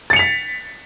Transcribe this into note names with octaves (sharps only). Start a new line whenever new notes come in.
A6 B6 C#7 F7